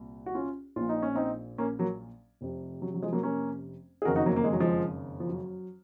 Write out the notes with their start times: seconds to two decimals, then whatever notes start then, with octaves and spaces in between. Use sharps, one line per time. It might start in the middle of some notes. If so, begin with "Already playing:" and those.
Already playing: C2 A#2
0.26 F#4
0.35 C#4 F4
0.76 A#1 A#2 F4
0.89 D#4
1.02 C#4
1.16 C4 D#4
1.58 A#3 C#4
1.79 F#3 A#3
2.41 F1 F2 C3
2.82 F#3
2.94 F#3
3.02 F3 G#3
3.13 F#3 A#3
3.23 A#3 C#4
4.02 G#4
4.05 F#1 F2 D#3 F#4 A#4
4.16 D#4 F#4
4.26 F#3 A#3
4.36 A#3
4.44 G#3
4.53 F#3
4.60 F3 G#3
5.20 F3
5.29 F#3